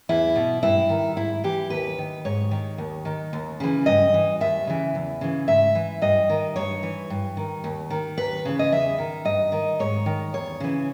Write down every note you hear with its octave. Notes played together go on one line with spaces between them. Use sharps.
E2 E4
B2
G2 E4
D#3
G#2 E4
E3 G4
D#2 B4
D#3
G#2 C#5
D#3
D#2
D#3
D#2
C#3 E3
G2 D#5
E3
D#2 E5
C#3 E3
E2
C#3 E3
G#2 E5
E3
G2 D#5
D#3
G2 C#5
E3
G2
D#3
D#2
D#3
D#2 B4
C#3 E3
D#5
E2 E5
D#3
G2 D#5
D#3
G#2 C#5
D#3
E2 C#5
C#3 E3